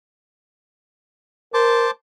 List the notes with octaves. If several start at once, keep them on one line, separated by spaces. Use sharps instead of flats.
A#4 C5 A5 D6